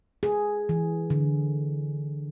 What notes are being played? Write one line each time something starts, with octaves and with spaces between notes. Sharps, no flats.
G#4
E3
D3